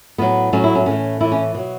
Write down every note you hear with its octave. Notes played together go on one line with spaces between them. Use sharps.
A2 F#3 B3
A2 F#3 C#4
E4
C#4
A2 E3 C#4
A2 E3 E4
C#4
B2 F#3